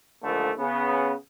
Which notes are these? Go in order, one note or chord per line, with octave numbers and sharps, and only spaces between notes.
D#2 G#2 D3 F3 A3 A#3
C#3 B3